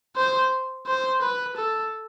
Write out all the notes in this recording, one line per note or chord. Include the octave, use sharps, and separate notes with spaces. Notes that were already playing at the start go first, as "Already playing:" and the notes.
C5
C5
B4
A4